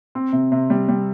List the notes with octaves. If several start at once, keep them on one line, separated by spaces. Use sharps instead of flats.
C4
C3
C3
G3
G3